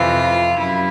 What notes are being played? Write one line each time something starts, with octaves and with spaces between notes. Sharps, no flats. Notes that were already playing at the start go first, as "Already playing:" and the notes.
Already playing: F2 C3 E3 F4
F#2 E4